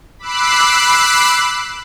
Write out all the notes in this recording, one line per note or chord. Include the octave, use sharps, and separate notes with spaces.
B5 D6 E6 F#6 C7